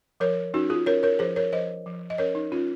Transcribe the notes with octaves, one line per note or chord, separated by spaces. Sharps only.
F3 A#4 C#5
C#4 D#4 F#4
F4 G#4
C#4 A#4 C#5
A#4 C#5
F3 G#4 C5
A#4 C#5
F3 C5 D#5
F3
D#5
C#4 A#4 C#5
D#4
C#4 F4